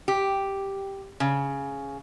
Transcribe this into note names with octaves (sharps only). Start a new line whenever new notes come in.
G4
C#3